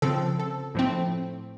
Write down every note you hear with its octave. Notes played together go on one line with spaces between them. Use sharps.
C#3 F3 C4 A4
A4
A2 F3 A3 C4